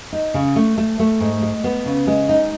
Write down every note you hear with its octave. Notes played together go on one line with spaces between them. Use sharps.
D#4
C#3
A3
A3
A3
G#2
G#3
B3
C#3
G#3
D#4